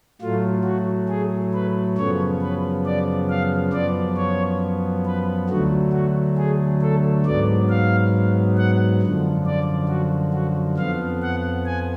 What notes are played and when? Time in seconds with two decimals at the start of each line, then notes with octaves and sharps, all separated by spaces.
0.21 A2 F#3 A3 F4
0.64 F#4
1.09 G#4
1.53 B4
1.97 F#2 C#3 F3 B3 C#5
2.41 B4
2.85 D5
3.29 F5
3.72 F#2 F3 B3 D5
4.16 C#5
5.05 B4
5.49 D2 D3 F#3 A3 F#4
5.93 F#4
6.38 G#4
6.81 A4
7.25 G#2 F#3 B3 D5
7.69 F5
8.57 F#5
9.01 F#2 D3 F3
9.46 D5
9.89 F#4
10.34 F#4
10.77 F2 F3 B3 F5
11.22 F#5
11.66 G#5